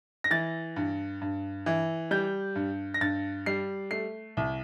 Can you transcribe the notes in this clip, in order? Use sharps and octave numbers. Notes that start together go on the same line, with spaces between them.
A#6
E3 A6
G2
G2
E3
G3 G6
G2
A#6
G2 A6
G3 C7
A3 C7
C2